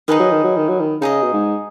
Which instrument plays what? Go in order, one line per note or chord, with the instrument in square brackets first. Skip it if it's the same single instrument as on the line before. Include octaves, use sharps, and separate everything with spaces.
[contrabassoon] D#3 [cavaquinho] D#4 G#4 B4 D#5
[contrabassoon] F#3
D#3
F#3
D#3
F#3
D#3
[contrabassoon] C#3 [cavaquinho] D#4 G#4 D#5
[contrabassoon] B2
G#2